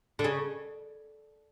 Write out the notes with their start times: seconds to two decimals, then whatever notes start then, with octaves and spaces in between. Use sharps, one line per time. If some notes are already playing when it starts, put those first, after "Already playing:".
0.19 D3
0.24 C#3